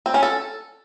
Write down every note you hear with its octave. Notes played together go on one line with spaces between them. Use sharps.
C4
C#4
A4